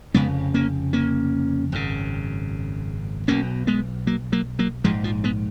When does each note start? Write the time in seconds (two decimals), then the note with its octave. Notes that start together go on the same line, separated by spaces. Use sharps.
0.14 F1 F2 C#3 G#3 B3
0.54 A#3 C#4
0.93 A#3 C#4
1.72 G#1 F#2 C#3
3.28 B1 B2 A#3 C#4
3.67 G#3 B3
4.07 F#3 A#3
4.32 F#3 A#3
4.59 F#3 A#3
4.84 A#1 G#2 F3 G#3
5.04 F3
5.24 G#3 B3